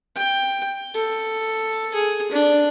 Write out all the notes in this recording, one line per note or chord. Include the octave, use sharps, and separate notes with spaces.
G5
A4
G#4
D4